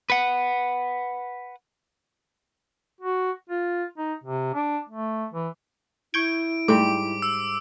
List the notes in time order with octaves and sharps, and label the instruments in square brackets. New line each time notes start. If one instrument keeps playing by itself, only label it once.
[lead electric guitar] B4 F#5
[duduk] F#4
F4
D#4
C3
D4
A3
E3
[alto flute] E4 [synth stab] C#6 G6 G#6 [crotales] D7
[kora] G#2 G3 G5 [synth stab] A3 [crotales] D6
[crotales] E6